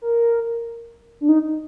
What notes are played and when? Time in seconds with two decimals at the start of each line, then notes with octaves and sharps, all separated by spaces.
0.02 A#4
1.21 D4
1.29 D#4